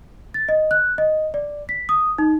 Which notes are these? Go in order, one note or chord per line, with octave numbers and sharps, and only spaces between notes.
A6
D#5
F#6
D#5
D5
B6
D#6
D#4